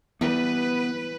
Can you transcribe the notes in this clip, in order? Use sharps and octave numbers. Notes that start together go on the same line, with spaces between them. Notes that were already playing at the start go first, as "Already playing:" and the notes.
E3 G3 B3 G4 B4